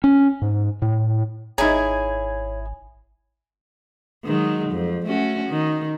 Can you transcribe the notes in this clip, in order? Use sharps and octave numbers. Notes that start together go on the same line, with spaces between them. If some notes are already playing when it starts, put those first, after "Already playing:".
C#4
G#2
A2
G#1 D#4 E4 G#4 C#5 E5 G#5 A#5
D#3 F#3 G#3
F2
A3 C#4 F#4
D#3